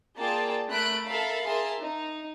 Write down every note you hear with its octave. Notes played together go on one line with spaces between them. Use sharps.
A#3 F4 G#4 D5 G5 A5
A3 A#4 B5 F#6 D7
A4 A#4 E5 F5 A5 B5
G#4 A#4 E5 A5 C6
D#4